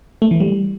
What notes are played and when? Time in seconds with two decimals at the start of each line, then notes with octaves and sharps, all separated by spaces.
0.22 A3
0.31 E3
0.40 G3